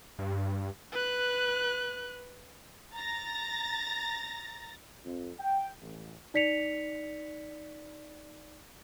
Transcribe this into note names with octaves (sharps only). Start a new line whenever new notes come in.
G2
B4 F#6
A#5 A6 A#6
F2
G5
A1
D#4 D5 B6 C#7 F7